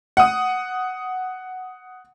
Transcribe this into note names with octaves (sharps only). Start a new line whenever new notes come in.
F#5 D#6